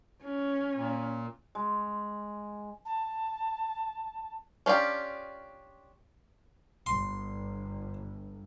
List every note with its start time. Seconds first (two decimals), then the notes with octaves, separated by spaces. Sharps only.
0.23 C#4
0.75 A#2
1.55 G#3
2.85 A5
4.66 C#4 D4 F4 G4
6.86 G1 C6